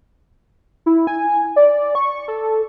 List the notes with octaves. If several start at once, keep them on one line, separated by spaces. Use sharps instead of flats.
E4
G#5
D5
C#6
A4